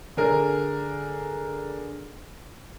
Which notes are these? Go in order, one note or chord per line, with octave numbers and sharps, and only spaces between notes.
D3 G#4 A#4